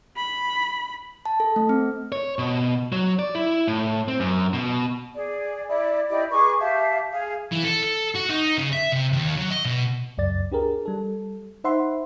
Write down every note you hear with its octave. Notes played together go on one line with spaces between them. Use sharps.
B5
A5
A4
A3
C4
C#5
B2
F#3
D5
E4
A2
C4
F#2
B2
G#4 D5
E4 D5
E4 G4 D5 D#5
G#4 B4 C#6 D6
G4 E5 F5 A5
G#4 F5
E3
A4
A4
F#4
D#4
C#3
E5
C3
D#2
F#3
D#5
B2
C#2 F#2 D5 A6
D4 G4 G#4 A#4
G3 A4
D#4 C5 E5 F#5 B5 C6